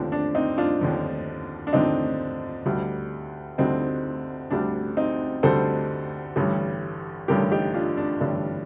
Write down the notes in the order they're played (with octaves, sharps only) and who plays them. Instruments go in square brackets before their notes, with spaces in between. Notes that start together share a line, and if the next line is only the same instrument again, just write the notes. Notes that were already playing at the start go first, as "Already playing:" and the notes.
Already playing: [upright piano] D#2 D3 F3 C4 D4
D4
C4 D#4
D4 F4
D#2 D3 F3
D4
D#2 D3 F3 C4 D#4
D2 D3 G3
D2 D3 G3 C4 D#4
D2 D3 G3 D4
C4 D#4
D2 D3 G3 A4 C5
A1 G2 D3 G3
A1 G2 D3 G3 G4 A#4
D#4 G4
D4 F4
D4
A1 G2 D3 G3 D4